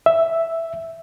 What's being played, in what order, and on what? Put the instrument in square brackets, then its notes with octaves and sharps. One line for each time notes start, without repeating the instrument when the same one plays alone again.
[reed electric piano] E5